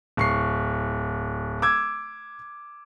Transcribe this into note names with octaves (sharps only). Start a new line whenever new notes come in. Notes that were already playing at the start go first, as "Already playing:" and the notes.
D1 C#6 C7
D6 E6 G#6